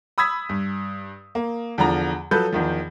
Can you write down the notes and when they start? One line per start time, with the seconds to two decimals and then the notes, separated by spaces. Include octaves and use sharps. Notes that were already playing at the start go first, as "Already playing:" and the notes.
0.18 B5 D#6 E6 G#6 B6
0.49 G2
1.35 A#3
1.78 E2 D3 F3 A#5
2.31 F3 F#3 A4 B4 G6
2.53 E2 D#3 F3